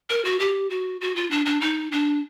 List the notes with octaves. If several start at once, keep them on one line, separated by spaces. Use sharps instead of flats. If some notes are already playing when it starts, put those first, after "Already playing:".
A#4
F#4
G4
F#4
F#4
F4
D4
D4
D#4
D4